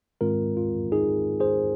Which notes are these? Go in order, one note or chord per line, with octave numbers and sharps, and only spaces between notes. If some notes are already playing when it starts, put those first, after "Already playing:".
G#2 D#3 G#3 C4 F4 A#4
F4
D#4 G#4
G#4 C5